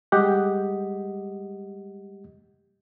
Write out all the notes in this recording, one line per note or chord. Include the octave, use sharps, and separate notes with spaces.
G3 G#3 G4 D#5 F#5